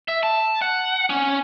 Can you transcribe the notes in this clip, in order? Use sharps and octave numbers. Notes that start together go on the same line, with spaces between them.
E5
A5
F#5
C#4